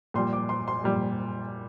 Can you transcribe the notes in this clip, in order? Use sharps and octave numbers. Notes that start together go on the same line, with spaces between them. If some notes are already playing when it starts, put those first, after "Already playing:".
A#2 G3 C6
D6
C6
C6
A#2 G3